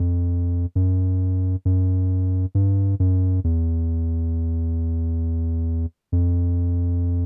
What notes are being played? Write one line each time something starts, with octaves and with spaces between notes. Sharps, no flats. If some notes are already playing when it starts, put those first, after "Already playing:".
Already playing: F2
F#2
F#2
G2
F#2
E2
F2